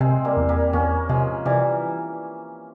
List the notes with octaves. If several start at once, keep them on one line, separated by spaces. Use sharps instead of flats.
C3 G#3 C4
G3 A#3
E2
G3 A#3
E2 A#3 C#4
C3 F3 G#3
C3 E3 G3